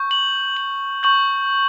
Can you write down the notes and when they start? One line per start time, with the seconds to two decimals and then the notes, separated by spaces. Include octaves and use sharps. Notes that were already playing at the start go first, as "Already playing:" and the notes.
Already playing: C#6 G6
0.11 F#7
0.57 F#7
1.03 C#6 G6 F#7